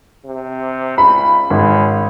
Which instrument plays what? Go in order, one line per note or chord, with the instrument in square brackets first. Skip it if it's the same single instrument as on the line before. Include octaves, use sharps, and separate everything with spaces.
[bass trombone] C3
[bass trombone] C#2 [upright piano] B5
[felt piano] G#1 [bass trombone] C#3